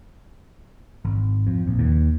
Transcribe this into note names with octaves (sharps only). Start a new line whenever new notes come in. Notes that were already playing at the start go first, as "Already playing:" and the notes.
G#1
F2
A#1
D#2